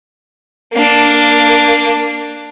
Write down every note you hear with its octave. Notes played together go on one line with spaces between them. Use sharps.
A#3 D4